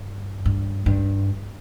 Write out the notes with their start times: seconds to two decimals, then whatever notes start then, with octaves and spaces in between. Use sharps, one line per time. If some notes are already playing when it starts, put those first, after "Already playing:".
Already playing: G2
0.45 G2
0.86 G2